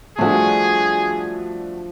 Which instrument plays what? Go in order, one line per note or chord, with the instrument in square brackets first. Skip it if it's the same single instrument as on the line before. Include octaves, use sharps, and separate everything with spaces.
[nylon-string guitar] F3 G3 [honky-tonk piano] A3 D4 F#4 [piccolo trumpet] G#4